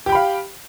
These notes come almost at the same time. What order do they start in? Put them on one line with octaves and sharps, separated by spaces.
G4 G5 B5 F5